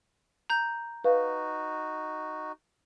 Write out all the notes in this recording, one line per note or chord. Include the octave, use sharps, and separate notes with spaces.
A#5 G6
D#4 F#4 B4 F5